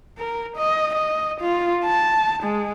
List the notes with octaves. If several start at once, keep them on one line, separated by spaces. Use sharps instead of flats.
A#4
D#5
D#5
F4
A5
G#3